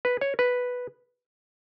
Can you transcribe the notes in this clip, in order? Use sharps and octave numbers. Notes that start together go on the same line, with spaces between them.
B4
C#5
B4